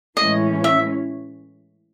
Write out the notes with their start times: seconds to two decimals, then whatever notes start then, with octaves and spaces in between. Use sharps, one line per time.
0.17 A2 E3 G#3 C#4 D#5
0.64 E5